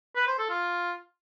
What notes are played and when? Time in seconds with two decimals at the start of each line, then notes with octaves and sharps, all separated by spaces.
0.16 B4
0.27 C5
0.38 A4
0.49 F4